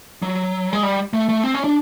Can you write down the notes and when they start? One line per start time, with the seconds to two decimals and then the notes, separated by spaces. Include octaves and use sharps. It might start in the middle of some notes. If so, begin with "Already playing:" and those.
0.22 F#3
0.73 G#3
0.83 G3
1.13 A3
1.29 A3
1.44 C4
1.54 C#4
1.64 D4